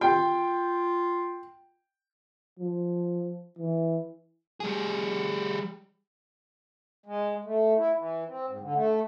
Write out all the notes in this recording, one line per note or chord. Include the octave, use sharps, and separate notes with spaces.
F4 G5
F3
E3
G3 G#4
G#3
A3
E4
E3
C4
G#2
D3
A3